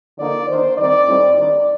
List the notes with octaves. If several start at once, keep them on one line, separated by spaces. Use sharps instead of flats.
D3 F3 A#3 D#4 D5
D#3 A#3 D4 C5
D#3 G3 C4 D#4 D5
A2 G3 C4 D#4
D#3 G3 D4 D5